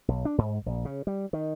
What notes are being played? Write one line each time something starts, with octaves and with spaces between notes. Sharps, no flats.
B1
D4
G#2
A#1
C#3
G3
D#3